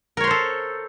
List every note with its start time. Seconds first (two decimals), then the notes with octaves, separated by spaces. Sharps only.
0.17 A#4
0.20 C#5
0.24 C6
0.27 C5
0.31 A4